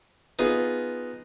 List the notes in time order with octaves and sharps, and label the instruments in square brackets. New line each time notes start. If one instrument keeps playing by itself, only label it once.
[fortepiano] B3 F4 G#4 [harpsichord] D#4